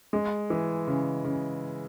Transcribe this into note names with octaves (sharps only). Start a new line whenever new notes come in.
G#3
E3
C#3
C#3